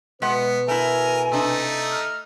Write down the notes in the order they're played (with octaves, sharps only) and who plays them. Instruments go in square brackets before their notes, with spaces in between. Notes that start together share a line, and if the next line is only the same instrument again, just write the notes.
[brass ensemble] B2 B4 [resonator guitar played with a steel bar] G#3 F#5 [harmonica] B3
[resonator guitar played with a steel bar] A3 E4 [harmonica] A#4 [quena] G#5
[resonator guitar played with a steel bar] C3 D4 [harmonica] A3 D#4
[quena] F6